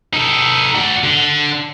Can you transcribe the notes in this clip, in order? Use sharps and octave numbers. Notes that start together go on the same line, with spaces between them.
D#4 A4
F#4 D5
D3